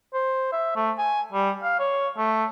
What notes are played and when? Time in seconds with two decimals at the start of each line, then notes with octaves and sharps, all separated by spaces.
0.14 C5
0.53 E5
0.76 A3
0.98 G#5
1.32 G3
1.63 F5
1.79 C#5
2.17 A3